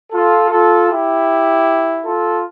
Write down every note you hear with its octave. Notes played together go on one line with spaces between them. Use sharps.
F4 A4
F4 A4
E4 G4
F4 A4